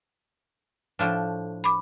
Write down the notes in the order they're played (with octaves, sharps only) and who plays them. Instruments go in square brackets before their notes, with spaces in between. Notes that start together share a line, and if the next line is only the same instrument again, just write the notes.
[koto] A2 F3 D4
[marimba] B5 D6